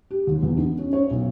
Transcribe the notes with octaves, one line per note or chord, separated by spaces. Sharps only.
G4
D#2
E2
D#4
C#4
C#5
B1